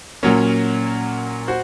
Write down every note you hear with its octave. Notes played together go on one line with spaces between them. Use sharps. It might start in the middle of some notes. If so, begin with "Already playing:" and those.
A#2 F#3 A#3 C#4
F#4 C5